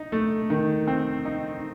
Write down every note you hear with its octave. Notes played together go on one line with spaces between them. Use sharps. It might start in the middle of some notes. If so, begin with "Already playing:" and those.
Already playing: D#4
A3
D#3
C4
D#4